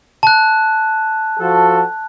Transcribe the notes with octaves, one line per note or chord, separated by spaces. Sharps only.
A5 F#6
F3 F#4 A4